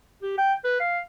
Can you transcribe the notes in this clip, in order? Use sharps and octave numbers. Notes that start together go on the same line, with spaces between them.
G4
G5
B4
F5